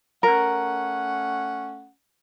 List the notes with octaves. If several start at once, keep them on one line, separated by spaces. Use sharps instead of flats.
A3 C#4 A#4 F#5